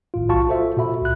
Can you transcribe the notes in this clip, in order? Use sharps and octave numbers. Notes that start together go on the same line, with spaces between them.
G#1 A2 F4
B1 F4 F#4 A5 C#6
F4 A4 C5 E5
A#2 F#4 E5 B5
C#2 F#6